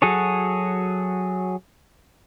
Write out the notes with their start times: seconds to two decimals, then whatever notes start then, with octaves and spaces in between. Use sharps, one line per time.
0.02 F#3 F#4 G#4 A4 C#5